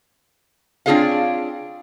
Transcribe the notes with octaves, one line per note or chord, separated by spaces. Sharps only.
C4 D4 F4 G#4 C#5 F5